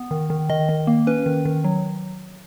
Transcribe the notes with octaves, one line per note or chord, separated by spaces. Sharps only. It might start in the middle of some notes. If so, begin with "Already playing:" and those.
Already playing: B3
D#3
D#3
D#3 D#5
D#3
A#3
C#4 B4
D#3
D#3
F#3